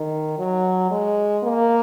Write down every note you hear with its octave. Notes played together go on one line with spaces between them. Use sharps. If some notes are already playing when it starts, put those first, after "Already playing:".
Already playing: D#3
F#3
G#3
A#3